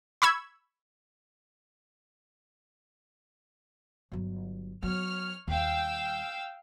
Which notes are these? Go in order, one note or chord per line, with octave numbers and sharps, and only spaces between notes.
B5 C#6 E6 G#6
G1 F#3
F#3 B3 C#5 F6
D#2 G3 F5 G5 E6